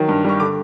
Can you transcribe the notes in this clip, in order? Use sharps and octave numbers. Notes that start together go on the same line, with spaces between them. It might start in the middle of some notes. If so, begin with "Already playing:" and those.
Already playing: D#3 F#3
G2
G3 C#6
D3 D6